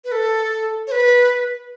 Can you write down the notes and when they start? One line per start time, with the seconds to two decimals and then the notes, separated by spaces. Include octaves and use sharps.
0.05 B4
0.12 A4
0.87 C#5
0.92 B4